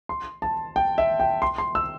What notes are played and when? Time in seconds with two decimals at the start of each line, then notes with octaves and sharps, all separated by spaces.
0.09 C6
0.42 A5
0.76 G5
0.98 E5
1.20 G5
1.42 C6
1.58 C6
1.75 E6